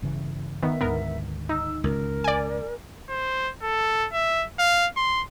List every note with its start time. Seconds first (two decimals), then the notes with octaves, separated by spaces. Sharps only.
0.02 G1 C#3 E3
0.63 D#3 B3 E5
0.81 D2 G#2 D#3 B3 A#4
1.49 D#4 E6
1.84 C#2 A#4
2.24 D5 G#5
3.09 C5
3.62 A4
4.13 E5
4.59 F5
4.96 C6